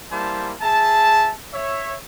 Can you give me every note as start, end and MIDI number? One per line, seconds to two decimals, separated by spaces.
0.12 0.53 55
0.12 0.53 58
0.12 0.53 64
0.12 0.53 72
0.12 0.53 81
0.61 1.33 68
0.61 1.33 76
0.61 1.33 81
1.53 1.96 73
1.53 1.96 76